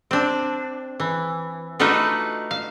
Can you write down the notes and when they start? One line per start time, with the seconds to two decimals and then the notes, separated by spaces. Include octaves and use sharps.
0.11 C4 D4
1.00 E3
1.79 A3 D4 D#4 F4 F#4 B4
2.51 F5